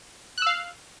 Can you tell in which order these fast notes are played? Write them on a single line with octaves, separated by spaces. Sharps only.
F#6 E6 F5